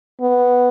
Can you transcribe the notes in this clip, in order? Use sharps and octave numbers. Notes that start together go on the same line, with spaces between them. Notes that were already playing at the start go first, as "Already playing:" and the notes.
B3